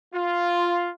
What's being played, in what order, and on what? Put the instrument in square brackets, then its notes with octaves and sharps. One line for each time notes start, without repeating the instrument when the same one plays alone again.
[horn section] F4